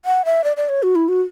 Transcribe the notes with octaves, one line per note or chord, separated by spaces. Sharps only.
F#5
E5
D5
D5
C#5
F#4
E4
F#4